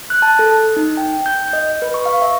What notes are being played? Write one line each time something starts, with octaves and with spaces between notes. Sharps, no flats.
F#6
A5
A4
D#4
G5
G6
D#5
B4
C#6
F5
E5